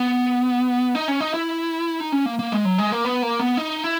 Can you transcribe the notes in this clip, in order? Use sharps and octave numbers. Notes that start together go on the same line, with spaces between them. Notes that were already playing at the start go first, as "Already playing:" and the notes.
Already playing: B3
D#4
C#4
D#4
E4
D#4
C#4
A#3
A#3
G#3
F#3
G#3
A#3
B3
A#3
B3
D#4
E4